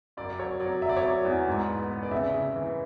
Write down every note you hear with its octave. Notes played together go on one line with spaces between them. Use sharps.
F#2 D5
F#3 C#5
F#3 D5
F#3 E5
D5
C#5
F#3 D5
E2
G#2
B3
B3
D5
C#3 E5
C#3
E3